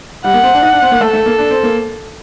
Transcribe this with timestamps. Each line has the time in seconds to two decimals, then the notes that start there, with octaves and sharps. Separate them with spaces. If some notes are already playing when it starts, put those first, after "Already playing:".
0.24 G3 F#5
0.34 A#3
0.43 C4
0.54 D4
0.62 D#4
0.73 D4
0.82 C4
0.91 A#3
1.00 A3 A4
1.13 A3
1.26 A#3
1.38 D4
1.51 C4
1.63 A#3